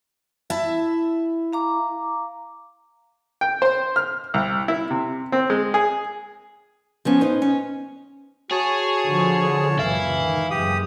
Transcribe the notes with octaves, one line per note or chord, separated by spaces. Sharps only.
E4 E5 A5
F5 A#5 D6
G5
C5
F6
C2
E4
C3
C4
G#3
G#4
F3 B3 C#4
D#4 B4 C5
C#4
F#4 G#4 C#5 A5
D3 F3
C#2 F#2 A#2 E3 E4 F5
D#3
F#1 G#3 G4 D#6